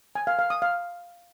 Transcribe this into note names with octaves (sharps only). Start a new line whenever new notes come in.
G#5
F5
F5
D#6
F5